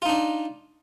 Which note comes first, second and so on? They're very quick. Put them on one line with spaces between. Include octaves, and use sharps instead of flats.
F4 D#4 D4